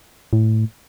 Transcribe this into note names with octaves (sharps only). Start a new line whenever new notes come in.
A2